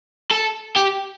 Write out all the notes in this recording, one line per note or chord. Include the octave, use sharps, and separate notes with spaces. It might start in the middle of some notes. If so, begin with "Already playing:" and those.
A4
G4